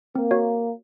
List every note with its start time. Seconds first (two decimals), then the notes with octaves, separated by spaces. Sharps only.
0.15 A#3 C4
0.31 F#4 C#5 F5